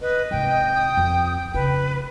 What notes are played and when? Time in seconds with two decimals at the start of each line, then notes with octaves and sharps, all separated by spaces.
0.01 B4 D#5
0.31 G#1 C3 G5
0.75 D#6
0.97 F2
1.54 F2 C#3 B4